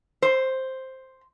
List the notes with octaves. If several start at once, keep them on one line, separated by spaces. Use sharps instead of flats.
C5